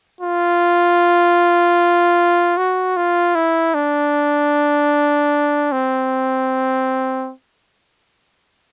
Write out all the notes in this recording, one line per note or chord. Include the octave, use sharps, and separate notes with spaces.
F4
F#4
F4
E4
D4
C4